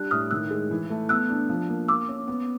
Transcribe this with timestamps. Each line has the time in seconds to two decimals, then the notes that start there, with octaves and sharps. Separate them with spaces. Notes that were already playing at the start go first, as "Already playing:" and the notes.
Already playing: G3 D4 F#6
0.11 A2 D#6 F6
0.31 D#3 E6 F#6
0.51 G#3
0.71 E3
0.90 A3
1.09 B3 E6 F#6
1.30 D4
1.49 F3
1.69 A#3
1.88 A#3 D6 E6
2.09 C#4
2.28 B3